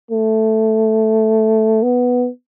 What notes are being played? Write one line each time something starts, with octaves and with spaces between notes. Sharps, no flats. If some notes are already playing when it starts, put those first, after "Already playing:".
A3
B3